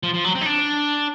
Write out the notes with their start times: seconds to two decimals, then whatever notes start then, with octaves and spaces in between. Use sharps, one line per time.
0.03 F3
0.14 F3
0.24 F#3
0.35 C4
0.41 D#4
0.46 D4